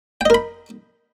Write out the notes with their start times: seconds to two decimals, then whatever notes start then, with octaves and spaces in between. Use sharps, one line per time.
0.21 G5
0.25 D#5
0.30 A#4
0.34 B5